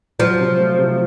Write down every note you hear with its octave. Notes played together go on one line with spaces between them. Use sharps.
F3 F#3
C3
A3
C3